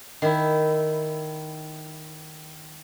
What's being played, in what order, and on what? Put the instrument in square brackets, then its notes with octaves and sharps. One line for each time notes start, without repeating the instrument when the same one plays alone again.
[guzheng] D#3 E4